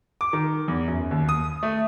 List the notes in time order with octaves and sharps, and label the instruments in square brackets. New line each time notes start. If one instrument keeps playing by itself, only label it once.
[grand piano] D6
D#3
E2
F#2
D#2
D#6
A3